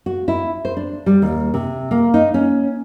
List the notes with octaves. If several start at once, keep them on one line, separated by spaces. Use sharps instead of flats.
F#4
E4
C5
D4
G3
D#2
C3
A#3
D#4
C#4